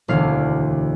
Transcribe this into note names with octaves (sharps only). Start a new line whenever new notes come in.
E1 D2 D3 F5